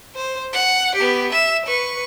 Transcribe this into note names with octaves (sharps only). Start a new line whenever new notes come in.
C5
F#5
B3 G4
E5 E7
B4 C#6